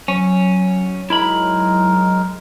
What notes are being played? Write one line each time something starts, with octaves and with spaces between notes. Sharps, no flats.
F#3 C#4
G#3 D#4 E4 A#4 B5